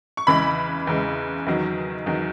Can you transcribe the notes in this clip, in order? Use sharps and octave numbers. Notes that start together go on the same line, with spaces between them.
C#6
E2 C#3 E3 G#3 B5
E2 C#3 E3 G#3
E2 D#3 F#3
E2 D#3 F#3